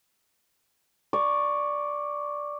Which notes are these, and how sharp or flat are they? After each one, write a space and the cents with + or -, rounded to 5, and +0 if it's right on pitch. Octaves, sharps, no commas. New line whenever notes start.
D5 +0 C#6 +0